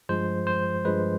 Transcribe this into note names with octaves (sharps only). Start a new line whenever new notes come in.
G2 F3 G#3 C5
C5
G2 F3 G#3 B4